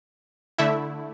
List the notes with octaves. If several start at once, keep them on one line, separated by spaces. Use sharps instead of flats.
D3 A3 E4 E5